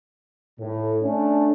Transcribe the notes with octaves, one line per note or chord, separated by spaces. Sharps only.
A2
A3 C#4 D4